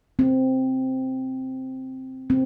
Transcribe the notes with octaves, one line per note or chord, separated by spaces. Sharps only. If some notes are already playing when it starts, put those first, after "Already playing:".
C4
C4